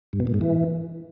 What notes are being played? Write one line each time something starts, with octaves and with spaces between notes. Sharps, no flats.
G2
B2
A#2
G#2
E3